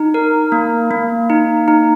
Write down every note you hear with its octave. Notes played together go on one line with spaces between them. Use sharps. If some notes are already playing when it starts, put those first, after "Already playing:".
Already playing: D#4
A#4
A#3
A#3
D#4
D#4